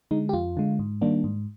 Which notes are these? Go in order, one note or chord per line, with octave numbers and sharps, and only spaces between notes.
D3 G#3 D#4
G4
F2 F4
D3 G#3
G#2
D#3 G3 A#3 D4
G#2